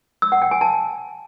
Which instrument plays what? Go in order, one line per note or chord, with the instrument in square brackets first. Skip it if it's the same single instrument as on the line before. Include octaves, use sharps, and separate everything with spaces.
[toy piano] E6
F#5
G5
G#5
A5